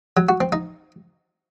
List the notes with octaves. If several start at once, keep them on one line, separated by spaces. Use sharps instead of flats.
F#3
F#4
C4
D#4